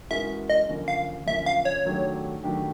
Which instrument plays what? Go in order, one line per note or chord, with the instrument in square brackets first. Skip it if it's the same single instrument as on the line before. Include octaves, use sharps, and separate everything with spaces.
[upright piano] E3 G#3 C#4 F#4 A#4 [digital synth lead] E5
[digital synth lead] D#5
[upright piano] F#2 D3 F3 A#3 C#4
[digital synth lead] F5
[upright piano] F#2 D3 F3 A#3 C#4 [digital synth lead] E5
[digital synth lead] F5
C#5
[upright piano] D#3 F#3 A3 D4 G4
D#3 F#3 A3 D4 G4